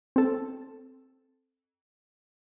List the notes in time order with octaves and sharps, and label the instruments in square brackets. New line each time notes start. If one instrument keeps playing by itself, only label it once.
[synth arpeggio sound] C4 A4